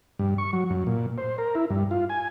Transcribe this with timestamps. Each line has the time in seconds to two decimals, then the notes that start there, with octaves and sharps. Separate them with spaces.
0.19 G2
0.38 C#6
0.53 F#3
0.70 F#2
0.87 A#2
1.18 C5
1.38 A#4
1.55 E4
1.70 G2
1.91 F4
2.10 G#5